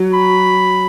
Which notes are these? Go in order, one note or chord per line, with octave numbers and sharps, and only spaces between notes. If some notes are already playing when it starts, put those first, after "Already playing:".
Already playing: F#3
B5